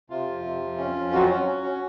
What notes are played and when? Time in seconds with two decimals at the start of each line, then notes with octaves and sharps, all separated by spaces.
0.10 C3 F4
0.27 F2
0.44 C3
0.61 F2
0.78 C#4
0.96 F2
1.13 F#3 F#4
1.29 C#4
1.46 C#4
1.63 C#4